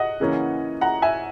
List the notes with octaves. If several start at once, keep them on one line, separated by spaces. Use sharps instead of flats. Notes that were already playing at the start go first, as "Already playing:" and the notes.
Already playing: D#5 F#5
C#3 E3 A#3 C#4
F#5 A#5
E5 G#5